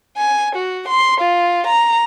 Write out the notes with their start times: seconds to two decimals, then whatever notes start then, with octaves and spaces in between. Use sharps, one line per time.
0.16 G#5
0.55 F#4
0.88 C6
1.20 F4
1.67 A#5